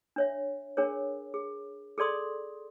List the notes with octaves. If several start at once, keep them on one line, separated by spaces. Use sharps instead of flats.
D4 C#5 E5
D4 G#4 A#4 C#5
G#4
G#4 A4 D5 C6 D#6